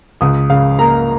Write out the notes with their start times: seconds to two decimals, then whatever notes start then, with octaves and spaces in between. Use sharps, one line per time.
0.21 C#2 D#6
0.50 C#3 F5
0.79 A#3 A#5